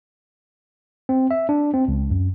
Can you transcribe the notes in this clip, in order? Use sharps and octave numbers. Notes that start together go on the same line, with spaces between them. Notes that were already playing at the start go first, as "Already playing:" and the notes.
C4
E5
D4
C4
C#2
F#2